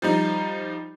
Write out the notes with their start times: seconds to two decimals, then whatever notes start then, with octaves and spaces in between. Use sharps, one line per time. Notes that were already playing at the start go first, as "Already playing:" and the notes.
0.02 F3 G3 D#4